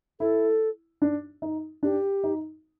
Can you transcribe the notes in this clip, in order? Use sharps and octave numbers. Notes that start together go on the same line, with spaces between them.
E4 A4
D4
D#4
D4 G4
D#4